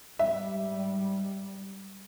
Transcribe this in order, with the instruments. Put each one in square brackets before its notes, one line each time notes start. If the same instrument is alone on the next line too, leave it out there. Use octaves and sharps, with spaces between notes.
[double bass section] G#2 G3 [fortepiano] E5